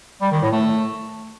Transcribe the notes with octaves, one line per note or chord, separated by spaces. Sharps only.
G3
D#3
A2
A3